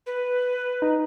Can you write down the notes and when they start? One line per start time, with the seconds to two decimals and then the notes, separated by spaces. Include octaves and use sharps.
0.06 B4
0.82 D#4